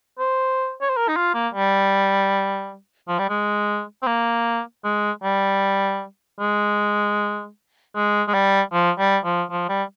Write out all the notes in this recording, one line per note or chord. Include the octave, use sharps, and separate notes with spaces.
C5
C#5
C5
A#4
D#4
F4
A#3
G3
F3
G3
G#3
C4
A#3
G#3
G3
G#3
G#3
G#3
G3
F3
G3
F3
F3
G3